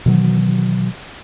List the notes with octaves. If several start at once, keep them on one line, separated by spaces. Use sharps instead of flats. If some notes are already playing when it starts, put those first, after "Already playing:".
B2 D#3 E3 F#3